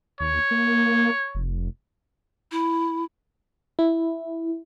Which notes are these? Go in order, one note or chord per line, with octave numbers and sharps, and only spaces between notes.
D#2 C#5
A#3
F1
E4
E4